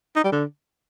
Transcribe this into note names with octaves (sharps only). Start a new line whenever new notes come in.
D#4
G3
D3